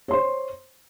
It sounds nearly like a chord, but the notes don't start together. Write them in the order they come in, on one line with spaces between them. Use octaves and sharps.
C#5 C6 C5